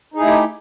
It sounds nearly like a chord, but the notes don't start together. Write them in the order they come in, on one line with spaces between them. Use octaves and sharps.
D#4 G#4 E4 A3 G4